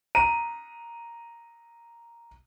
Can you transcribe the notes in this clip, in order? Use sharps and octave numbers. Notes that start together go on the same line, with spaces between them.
A#5 D#7